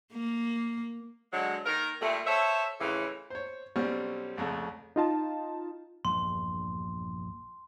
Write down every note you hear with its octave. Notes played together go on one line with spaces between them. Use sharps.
A#3
D3 F#3 G#3
D#3 A#3 A#4
A#2 G3 A3
A4 C5 C#5 E5
F2 A2 C#3 E3
C5 C#5
B1 G3 C4 C#4 C#6 F6
C2 F2 C#3 A3
D#4 F4 A5
A#1 E2 G2 C6